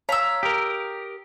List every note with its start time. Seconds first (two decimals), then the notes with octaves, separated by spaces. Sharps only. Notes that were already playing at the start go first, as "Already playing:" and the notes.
0.09 C#5 F5 A#5 E6 B6
0.43 G4 A#4 D#6